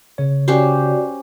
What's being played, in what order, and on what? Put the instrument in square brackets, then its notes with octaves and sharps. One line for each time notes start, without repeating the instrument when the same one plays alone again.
[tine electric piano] C#3 C#5
[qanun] C#4 G4 C5 [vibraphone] F#4 D5